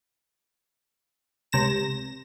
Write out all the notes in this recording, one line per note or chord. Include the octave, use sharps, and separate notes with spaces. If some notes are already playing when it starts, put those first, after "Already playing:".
C#2 C3 A#6 E7